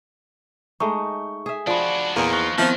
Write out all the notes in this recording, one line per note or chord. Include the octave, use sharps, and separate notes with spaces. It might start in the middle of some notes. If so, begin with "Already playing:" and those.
G#3 A3 D#4 C#6
G#4 E5
F3 D4 F#4 D5 B5
E2 A#2 A#3 D#4
F3 C#6 F#6 A#6
D#3 F3 B3 C4 E4 F4 C5